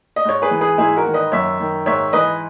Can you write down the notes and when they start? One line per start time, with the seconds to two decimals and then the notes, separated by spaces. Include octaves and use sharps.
0.16 D#5
0.25 G#2 C#5
0.42 G#4 B4
0.51 E3
0.61 G#4 B4
0.78 G#2 E4 G#4
0.96 F#4 A#4
1.06 D#3
1.14 B4 D#5
1.32 F#2 C#5 E5
1.60 D#3
1.86 G#2 C#5 E5
2.13 E3 B4 D#5